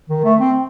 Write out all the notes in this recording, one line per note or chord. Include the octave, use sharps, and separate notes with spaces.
D#3
A3
C4